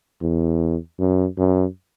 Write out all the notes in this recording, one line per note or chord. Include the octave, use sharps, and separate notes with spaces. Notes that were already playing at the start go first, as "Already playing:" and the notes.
E2
F#2
F#2